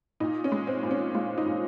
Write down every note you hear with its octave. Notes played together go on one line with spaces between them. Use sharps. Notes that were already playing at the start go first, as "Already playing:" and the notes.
A#2 D#4
C#4
G#3
C4
A#2
C#4
G#3 F4
D#4
A#2